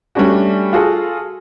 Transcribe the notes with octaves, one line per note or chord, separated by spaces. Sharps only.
G3 A3 C#4 D4 F#4
F4 F#4 G#4 A4